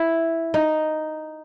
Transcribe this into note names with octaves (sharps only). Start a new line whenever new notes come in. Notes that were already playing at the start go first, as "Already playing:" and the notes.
Already playing: E4
D#4